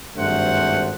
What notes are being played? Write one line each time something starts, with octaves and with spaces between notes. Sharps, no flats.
G#1 G2 A3 C5 F#5